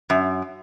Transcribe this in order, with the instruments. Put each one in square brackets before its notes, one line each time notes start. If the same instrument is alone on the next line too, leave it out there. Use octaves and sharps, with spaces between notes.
[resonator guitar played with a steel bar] F#2